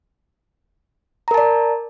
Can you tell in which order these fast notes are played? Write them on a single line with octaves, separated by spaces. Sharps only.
A#5 A#4 A5 D5